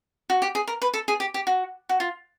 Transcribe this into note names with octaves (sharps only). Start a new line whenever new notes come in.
F#4
G4
G#4
A#4
B4
A4
G#4
G4
G4
F#4
F#4
F4